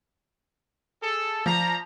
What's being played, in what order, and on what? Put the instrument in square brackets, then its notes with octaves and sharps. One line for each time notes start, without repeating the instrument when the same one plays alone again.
[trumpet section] G#4 A4
[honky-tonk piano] F3 [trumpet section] D5 A#5